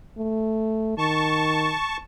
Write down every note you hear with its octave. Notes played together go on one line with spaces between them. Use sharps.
A3
D#3 A5 C#6